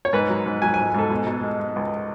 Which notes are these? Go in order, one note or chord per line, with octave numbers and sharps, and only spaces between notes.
C#5
G#2 B4
F#3
G#2
F#3 G#5
G#2 G#5
G#2 A4
B2
B2
G#3
G#3
C#2